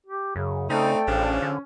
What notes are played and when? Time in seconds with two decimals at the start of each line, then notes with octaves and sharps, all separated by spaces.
0.06 G4
0.36 F#2 C#3
0.70 C#3 A3 C4 D#4 A4 D5 G5
1.07 A1 C#3 F3 D4
1.23 C#4
1.42 D3